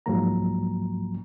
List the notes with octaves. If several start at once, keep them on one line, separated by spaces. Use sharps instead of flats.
C2 G#2 F3 F#3 A#3 A#5